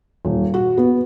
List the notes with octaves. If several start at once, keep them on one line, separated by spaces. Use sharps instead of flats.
D#1
F#4
B3